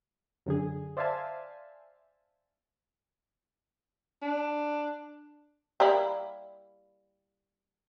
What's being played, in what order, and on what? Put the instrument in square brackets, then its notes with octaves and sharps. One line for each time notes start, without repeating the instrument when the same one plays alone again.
[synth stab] F#2 D3 G#4
C5 D5 E5 F5 G#5 A5
[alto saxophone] D4
[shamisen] G3 A#3 E4